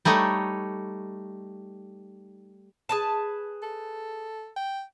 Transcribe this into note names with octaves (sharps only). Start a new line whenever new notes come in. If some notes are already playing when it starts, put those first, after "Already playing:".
G3 A3 D#4 C#5
G#4 B4 A5
A4
G5